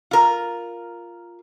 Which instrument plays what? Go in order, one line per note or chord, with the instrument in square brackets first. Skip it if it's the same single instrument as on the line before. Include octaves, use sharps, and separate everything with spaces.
[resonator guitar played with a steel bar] F4 A#4